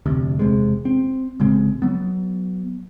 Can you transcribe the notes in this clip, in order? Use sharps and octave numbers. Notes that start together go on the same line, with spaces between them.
F1 D2 C3
E1 C3 G#3
C4
A1 C#3 G#3 C4
F#3 B3